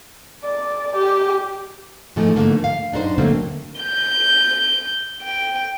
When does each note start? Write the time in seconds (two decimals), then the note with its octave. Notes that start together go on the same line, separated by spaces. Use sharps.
0.43 D5
0.95 G4
2.16 G#2 E3 F3 G#3 A3
2.36 G#2 D3 A3 A#3
2.64 F5
2.92 F#2 D4 D#4 A4 C5
3.18 D3 F#3 A3 A#3 C4
3.81 G6
5.23 G5